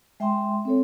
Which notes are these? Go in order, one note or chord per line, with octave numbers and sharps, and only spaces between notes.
G#3 E5 G5 G#5 C6
C4 A4 C#5